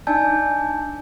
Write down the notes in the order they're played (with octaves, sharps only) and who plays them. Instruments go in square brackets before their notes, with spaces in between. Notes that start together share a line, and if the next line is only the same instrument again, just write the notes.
[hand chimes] D4 D#4 D5 G#5 A5 G6